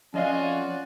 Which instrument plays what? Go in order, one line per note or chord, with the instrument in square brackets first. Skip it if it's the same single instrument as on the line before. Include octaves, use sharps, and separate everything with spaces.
[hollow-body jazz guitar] F2 D#5 F5 [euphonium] C#4 [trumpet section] F4 F#4 G#5 [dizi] D5